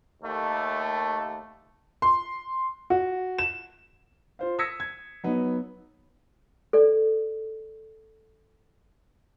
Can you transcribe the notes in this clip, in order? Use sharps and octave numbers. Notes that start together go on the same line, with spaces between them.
D#2 A3
C6
F#4
E7
F4 C5 F5
D#6 E6 G#6 A#6 B6 C#7
G#6
F#3 B3 D#4
A4 D5